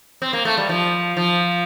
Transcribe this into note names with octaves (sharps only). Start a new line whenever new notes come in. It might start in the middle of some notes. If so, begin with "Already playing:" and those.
C4
A#3
A3
G3
F3
F3